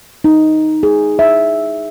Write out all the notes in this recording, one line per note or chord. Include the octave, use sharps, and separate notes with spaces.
D#4
G#4
E5